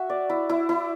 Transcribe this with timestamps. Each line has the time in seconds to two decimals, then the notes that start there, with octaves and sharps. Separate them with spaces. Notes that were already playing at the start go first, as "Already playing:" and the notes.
Already playing: F#4 E5
0.10 D5
0.30 E4
0.50 E4
0.69 E4